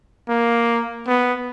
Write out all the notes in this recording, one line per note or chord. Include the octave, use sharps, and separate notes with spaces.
A#3
B3